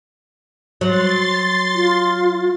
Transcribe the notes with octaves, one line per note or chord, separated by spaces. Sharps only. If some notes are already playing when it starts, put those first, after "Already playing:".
F#3 C6 A6
F4